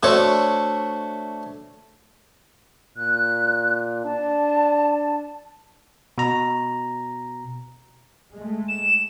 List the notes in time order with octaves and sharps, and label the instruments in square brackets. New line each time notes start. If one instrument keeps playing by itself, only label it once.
[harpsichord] A3 D4 F#4 C5 C#5 E5
[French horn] A#2 [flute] F#6
[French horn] D4 [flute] A5
[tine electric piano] B2 A#5
[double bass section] G#3 A3
[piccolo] E7